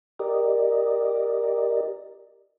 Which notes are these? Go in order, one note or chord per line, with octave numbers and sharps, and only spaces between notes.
G4 A#4 D5 D#5